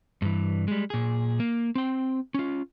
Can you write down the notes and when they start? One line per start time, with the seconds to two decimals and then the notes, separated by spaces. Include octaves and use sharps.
0.22 G2 E3
0.68 G3 G#3
0.90 A#2 G#4
1.40 A#3
1.75 C4 G5
2.34 C#4 F4